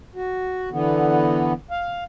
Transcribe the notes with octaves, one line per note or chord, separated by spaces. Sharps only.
F#4
D3 E3 B3
F5